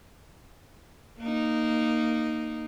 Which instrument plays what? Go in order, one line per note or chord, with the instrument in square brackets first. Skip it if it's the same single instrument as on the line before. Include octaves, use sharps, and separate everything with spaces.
[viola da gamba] A#3 D#4